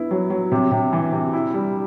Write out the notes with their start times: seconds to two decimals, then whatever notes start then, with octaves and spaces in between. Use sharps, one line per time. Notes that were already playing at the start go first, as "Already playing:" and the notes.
Already playing: B3 E4
0.11 F#3
0.30 F#3
0.52 C3
0.71 C3
0.93 E3
1.12 C3
1.33 E4
1.54 G3